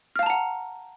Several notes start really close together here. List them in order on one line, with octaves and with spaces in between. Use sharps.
F6 F5 A5 A#5 F#5